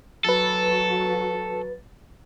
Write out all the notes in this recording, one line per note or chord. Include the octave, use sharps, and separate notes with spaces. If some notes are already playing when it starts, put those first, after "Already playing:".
F#3 F#4 A4 B4 A6